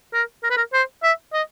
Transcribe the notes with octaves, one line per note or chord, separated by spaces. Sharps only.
A#4
A#4
B4
A#4
C5
E5
D#5